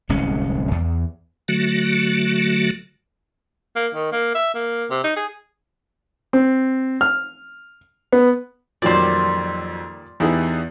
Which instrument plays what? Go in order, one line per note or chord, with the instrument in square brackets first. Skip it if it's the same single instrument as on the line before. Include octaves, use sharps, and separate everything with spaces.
[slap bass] D1 C2 G#3 C#4
E2
[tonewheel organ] D3 F#3 A3 F#4
[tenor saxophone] A#3
D#3
A#3
E5
A#3
C3
D#4
G#4
[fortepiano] C4
F6
B3
[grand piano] F2 F#3 [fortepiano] A#2 D#3 G3 [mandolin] C5 D5
[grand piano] E2 B3 D#4 [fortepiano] E4 G4 G#4